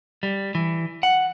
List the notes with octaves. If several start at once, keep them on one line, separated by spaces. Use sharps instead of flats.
G3
E3
F#5